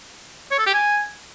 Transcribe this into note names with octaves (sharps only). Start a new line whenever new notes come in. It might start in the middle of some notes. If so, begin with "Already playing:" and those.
C#5
A4
G4
G#5